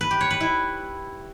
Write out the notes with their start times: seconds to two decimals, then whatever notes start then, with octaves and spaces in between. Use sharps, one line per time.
0.01 B4
0.11 G4
0.21 C#5
0.31 B4
0.40 E4